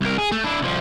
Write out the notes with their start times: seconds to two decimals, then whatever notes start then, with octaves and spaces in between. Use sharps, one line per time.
0.01 C2 A#4
0.18 G#4
0.32 A3
0.44 D4 E4
0.61 C2 F3